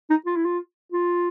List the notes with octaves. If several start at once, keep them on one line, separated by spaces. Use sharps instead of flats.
D#4
F4
E4
F4
F4